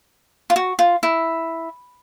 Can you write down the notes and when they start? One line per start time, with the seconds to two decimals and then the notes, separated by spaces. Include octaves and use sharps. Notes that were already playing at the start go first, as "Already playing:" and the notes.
0.50 F4
0.56 F#4
0.79 F4
1.03 E4